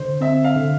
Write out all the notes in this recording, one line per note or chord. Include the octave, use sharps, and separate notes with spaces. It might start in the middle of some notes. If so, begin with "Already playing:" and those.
Already playing: D3 C5
C4 E5
F5
D3